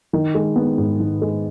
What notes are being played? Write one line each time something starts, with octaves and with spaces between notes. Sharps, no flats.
D#3
G#3
B3
G#2
D#3
G#3